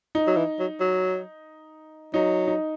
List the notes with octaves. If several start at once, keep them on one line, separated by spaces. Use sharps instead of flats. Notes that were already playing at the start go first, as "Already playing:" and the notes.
D#4
F#3
E3
F#3
F#3
F#3 D#4
D#4